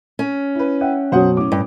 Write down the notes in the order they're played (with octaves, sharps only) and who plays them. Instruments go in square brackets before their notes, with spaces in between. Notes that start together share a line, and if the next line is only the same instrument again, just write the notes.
[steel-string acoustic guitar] C#4
[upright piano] E4 B4
[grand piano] E5 F#5 G5
[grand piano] F#2 B2 F#3 [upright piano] C5 F#5 D#6
[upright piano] A2 C#4 [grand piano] D6
[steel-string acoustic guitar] G2